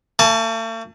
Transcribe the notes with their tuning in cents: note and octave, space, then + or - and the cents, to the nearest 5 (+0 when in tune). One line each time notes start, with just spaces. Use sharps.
A3 +45 A5 -25